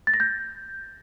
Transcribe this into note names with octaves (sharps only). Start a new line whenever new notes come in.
A6
A#6
G6